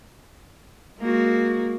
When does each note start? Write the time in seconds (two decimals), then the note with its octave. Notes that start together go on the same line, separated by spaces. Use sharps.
0.98 G#3 A#3 F#4